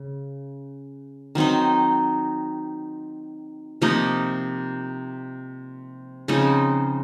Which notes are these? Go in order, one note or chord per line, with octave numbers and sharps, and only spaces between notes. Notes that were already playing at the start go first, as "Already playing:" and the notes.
Already playing: C#3
D#3 F#3 C4 D#4
C3 F3 A#3 D#4
C#3 F3 C4 D#4